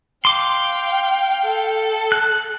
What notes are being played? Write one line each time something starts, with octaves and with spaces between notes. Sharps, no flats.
F5 G5 C6 D6
A4
F#6